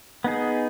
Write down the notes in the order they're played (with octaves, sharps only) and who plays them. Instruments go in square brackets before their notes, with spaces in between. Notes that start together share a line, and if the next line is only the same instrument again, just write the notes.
[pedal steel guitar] B3 D#4 G#4